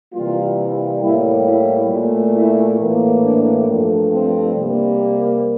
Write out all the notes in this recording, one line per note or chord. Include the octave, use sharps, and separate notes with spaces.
C3 E3 G3 A#3 F4
A2 G3 A#3 E4
E4
A#2 A3
E4
A2 E3 A#3
D4
G2 F3 A3
C4
C3 G3 A#3